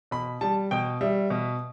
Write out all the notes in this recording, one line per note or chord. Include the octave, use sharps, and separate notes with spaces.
B2 B5
G3 A5
B2 G5
G3 E5
B2